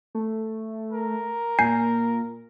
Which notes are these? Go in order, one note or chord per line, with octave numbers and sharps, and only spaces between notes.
A3
A#4
A#2 G#5 G6 C7